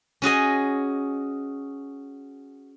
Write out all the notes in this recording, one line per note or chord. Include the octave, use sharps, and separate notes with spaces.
C#4 F#4 G#4 D#5